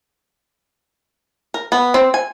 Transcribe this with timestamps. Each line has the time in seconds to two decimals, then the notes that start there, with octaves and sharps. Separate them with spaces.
1.54 A#4
1.72 B3
1.94 C4
2.14 G#5